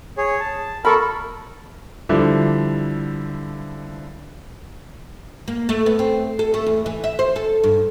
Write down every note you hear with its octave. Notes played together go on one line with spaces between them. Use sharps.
G#4 C#5
A5
A4 A#4 B5 C#6
D3 F3 G3 E4
A#3
A3
B3
C4
A4
A3
E2
E3
E5
C5
A4
G2